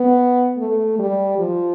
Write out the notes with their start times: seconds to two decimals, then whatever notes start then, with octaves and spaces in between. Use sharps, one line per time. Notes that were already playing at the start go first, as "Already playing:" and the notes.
Already playing: B3
0.58 A3
0.99 G3
1.39 F3